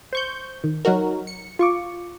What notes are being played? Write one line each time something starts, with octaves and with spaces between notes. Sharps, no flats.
C5 C#6 G6
D#3
F#3 D#4 F#4 A#4
C#7
F4 C#6 D6